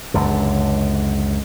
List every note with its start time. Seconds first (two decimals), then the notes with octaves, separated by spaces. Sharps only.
0.14 C#2 F#2 D3